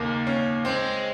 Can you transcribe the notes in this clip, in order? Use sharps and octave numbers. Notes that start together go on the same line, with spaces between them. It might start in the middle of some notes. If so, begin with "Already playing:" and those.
Already playing: D#2 C#3 A#3
C#4
G#3 C4